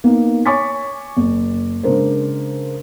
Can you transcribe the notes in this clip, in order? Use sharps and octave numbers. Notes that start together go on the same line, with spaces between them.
A#3 B3 D#4
C#5 G#5 C#6 D6 A6 B6
F#1
C#3 G#3 D4 A#4 C5